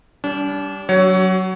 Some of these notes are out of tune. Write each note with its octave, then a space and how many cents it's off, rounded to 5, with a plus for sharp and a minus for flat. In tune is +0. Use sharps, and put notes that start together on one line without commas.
G3 +0 D4 -35
F#3 +15 F#4 +45 C#5 +15